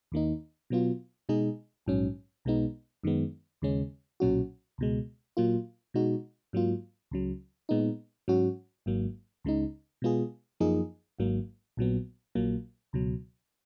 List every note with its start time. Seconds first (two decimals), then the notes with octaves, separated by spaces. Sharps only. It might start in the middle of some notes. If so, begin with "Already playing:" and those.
0.12 D#2 D#3 A#3 D#4
0.70 B2 F#3 B3 F4
1.29 B2 G#3 D#4 G#4
1.86 A#1 G#2 F#3 C#4
2.45 B1 B2 G#3 B3 D#4
3.04 F#2 D#3 G#3 B3
3.62 D#2 C#3 G#3 C#4
4.20 B1 A#2 F#3 C#4 F#4
4.78 C#2 B2 G#3
5.37 A#2 F#3 A#3 F4
5.94 B2 G#3 D#4 F#4
6.53 G#2 F#3 A#3 F4
7.11 C#2 C#3 F#3
7.69 A#2 G#3 B3 D#4
8.28 G#2 F#3 C#4 F#4
8.86 G#1 G#2 F#3 A#3
9.44 C#2 C#3 G#3 D#4
10.02 B2 G#3 B3 F4 G#4
10.60 F#2 F3 A#3 D#4 G#4
11.19 G#1 G#2 F#3 A#3
11.77 A#1 A#2 F#3 B3
12.35 A#1 A#2 F#3 A#3
12.93 C#2 B2 F#3